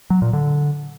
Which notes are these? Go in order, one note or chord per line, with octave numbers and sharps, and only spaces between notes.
F#3
A#2
D3